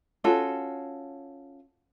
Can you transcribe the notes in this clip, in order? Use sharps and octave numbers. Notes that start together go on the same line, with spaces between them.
C#4 F4 F#4 A4